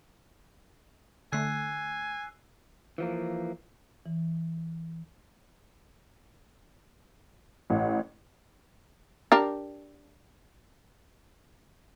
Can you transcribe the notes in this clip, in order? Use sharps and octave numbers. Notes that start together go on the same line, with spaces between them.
D3 A3 G#5 E6 F#6 C7
E3 F3 A#3
E3
A1
D4 G4 A#4